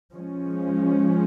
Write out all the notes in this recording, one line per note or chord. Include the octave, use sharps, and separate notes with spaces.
F3 G#3 C#4